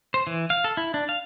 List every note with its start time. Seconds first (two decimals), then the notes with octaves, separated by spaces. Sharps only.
0.14 C5
0.27 E3
0.50 F5
0.64 A4
0.77 E4
0.94 D4
1.09 F5